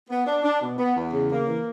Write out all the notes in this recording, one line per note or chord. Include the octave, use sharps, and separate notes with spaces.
B3
D4
D4
B2
B3
E2
C#3
A#3
E3